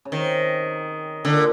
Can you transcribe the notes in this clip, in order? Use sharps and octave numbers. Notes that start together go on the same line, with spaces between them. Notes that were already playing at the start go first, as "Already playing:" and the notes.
C#3
C3 D#3
A#2 D3